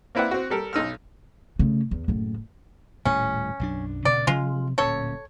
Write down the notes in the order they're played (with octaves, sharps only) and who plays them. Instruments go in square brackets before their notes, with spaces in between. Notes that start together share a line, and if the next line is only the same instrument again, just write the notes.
[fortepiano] A#3 C4 E4 B4 D5 F#5
C4 F#4
G3 A4 A#4
B1 D#4 E6 F6
[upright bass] C#3 A3
E2
F#1 A2
[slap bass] D#1 A2 G3 [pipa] C#4
[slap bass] B1 F#2 D4
[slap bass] D2 A#2 C#3 [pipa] D5
[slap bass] B2 F3 F#3 [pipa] G#3 F4
[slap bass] D1 A#2 C#4 [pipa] A4 C#5